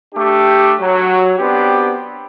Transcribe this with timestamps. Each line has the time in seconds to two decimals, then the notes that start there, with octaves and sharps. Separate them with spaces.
0.14 A3 D4 G4
0.80 F#3
1.38 B3 C4 D4 G4